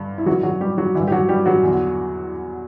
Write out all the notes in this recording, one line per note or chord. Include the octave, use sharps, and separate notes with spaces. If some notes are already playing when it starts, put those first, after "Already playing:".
Already playing: G2 D3
E4
F#2 D3 F#3 F#4
F#3 F#4
G3 G4
F#3 F#4
G2 D3 E3 E4
G4
F#3 F#4
G3 G4
F#3 F#4
E2 D3